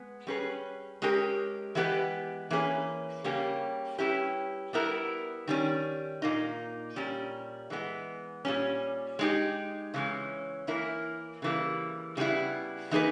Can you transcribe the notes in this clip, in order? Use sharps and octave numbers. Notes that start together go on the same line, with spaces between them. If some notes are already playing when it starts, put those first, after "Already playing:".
Already playing: G#3 B3
G3 C#4 G#4 B4
G#3 C#4 G4 A#4
E3 G#3 B3 G4 B4
E3 A#3 C#4 G#4 B4
C#3 G3 A#3 C#4 G4
G3 C#4 E4 G4 B4
G3 B3 E4 A#4
D#3 G3 C#4
A#2 A#3 D#4
A#2 G3 C#4
E3 G#3 B3
A#2 G3 C#4
G#3 D#4 G4
C#3 E3 G#3 C#4
E3 A#3 E4 A#4
C#3 E3 G3 A#3
C#3 G3 B3 E4
E3 A#3 D#4 G#4 B4